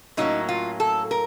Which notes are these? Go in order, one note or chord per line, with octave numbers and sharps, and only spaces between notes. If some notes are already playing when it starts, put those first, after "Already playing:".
A2 F#3 A#3 C#4 D#4
F4
A4
A#4